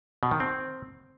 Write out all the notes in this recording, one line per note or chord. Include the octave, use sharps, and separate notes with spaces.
B2
D#3
C4